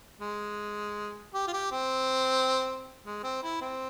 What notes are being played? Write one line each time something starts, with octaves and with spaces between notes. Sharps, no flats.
G#3
G4
F4
G4
C4
G#3
C4
E4
C4